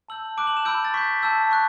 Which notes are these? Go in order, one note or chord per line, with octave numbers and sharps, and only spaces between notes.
A5 E6 G6 F#7
A5 D6 F#6 D7
F#7
E7
B5 E6 G6 D7
A6
C#6 G6 B6
A5 E6 G6
C#6 F#6